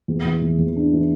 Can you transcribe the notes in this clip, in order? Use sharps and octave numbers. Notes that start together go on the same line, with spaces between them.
E2
E3
E2
E2
D4
E3